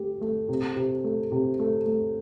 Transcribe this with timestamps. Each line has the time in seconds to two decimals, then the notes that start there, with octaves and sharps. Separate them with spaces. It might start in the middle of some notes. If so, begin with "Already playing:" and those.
Already playing: A3 G4
0.21 A3
0.49 C3
0.76 C3
1.04 A3
1.32 C3
1.59 A3
1.86 A3